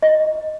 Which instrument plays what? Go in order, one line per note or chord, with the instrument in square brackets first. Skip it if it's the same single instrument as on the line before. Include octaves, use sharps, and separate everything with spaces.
[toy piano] D#5